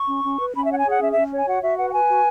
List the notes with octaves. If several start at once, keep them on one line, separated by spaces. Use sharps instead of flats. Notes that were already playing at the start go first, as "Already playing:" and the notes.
Already playing: C#6
C#4
C#4
B4
C#4 B5
E5
C#5 F#5
G#5
G#4 F#5
C#4 E5
C#4 E5
C#5 G#5
F#4 F#5
F#4 E5
B4 F#5
F#5
B4 G#5
F#4